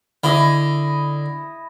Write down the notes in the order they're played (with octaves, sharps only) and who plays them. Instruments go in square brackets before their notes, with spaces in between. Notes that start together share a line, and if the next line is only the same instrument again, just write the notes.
[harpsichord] D3 [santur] E4 D#5 D#6